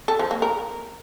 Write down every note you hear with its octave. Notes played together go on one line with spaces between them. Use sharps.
A4
F3
A#3
A#4